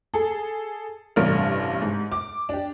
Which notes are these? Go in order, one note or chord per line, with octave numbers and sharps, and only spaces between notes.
G#4 A4
A1 G2 C3 D4 F6
G#2
D6
D4 G4